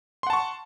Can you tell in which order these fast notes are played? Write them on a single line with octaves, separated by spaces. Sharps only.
C6 F#5 A5 C#6